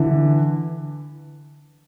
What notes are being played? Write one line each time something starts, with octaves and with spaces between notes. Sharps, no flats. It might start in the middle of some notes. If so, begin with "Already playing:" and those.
Already playing: D3 E3